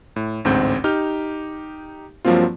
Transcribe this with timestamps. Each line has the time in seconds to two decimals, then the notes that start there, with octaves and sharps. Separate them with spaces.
0.16 A2
0.45 A1 D2 G#2 C4 G6
0.84 D#4 G4 F6 G6
2.25 G2 F3 F#3 A#3 C4 F4